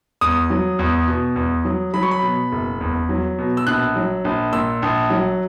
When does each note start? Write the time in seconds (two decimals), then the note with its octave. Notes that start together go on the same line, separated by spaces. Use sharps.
0.21 E2 D#6
0.50 F#3
0.79 E2
1.08 B2
1.36 E2
1.65 F#3
1.94 F#3 B5
2.03 C#6
2.11 B5
2.23 B2
2.52 F#1
2.81 E2
3.09 F#3
3.38 B2
3.57 E6
3.67 A#1 F#6
3.96 F#3
4.25 A#1
4.53 A#2 E6
4.82 A#1
5.10 F#3